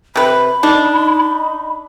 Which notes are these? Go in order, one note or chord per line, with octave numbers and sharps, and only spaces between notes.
C3 B4 B5
D4 D#4